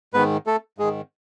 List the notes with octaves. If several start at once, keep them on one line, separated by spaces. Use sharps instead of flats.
G#2 D#3 B3 B4
A3 A4
G#2 D#3 G#3 G#4